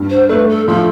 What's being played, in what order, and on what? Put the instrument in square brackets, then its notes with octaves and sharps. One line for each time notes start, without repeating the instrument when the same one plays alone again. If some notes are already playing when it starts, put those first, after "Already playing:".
Already playing: [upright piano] G2
[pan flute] C5
[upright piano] A3 [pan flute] B4
[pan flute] A4
[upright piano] F3 [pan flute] A4